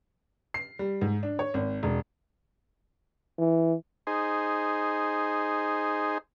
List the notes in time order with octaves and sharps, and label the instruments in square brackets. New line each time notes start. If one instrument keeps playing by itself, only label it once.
[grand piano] C7
G3
G#2
D4
C#5
G#1
E1
[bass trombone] E3
[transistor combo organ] D#4 G#4 C5